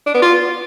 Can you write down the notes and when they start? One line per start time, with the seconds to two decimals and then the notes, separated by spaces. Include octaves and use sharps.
0.06 D4
0.14 B3
0.22 F4